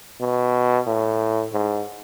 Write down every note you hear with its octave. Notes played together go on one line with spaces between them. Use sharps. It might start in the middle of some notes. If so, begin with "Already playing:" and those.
B2
A2
G#2